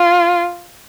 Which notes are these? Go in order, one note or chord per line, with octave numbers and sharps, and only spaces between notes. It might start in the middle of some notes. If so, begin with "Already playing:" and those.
Already playing: F4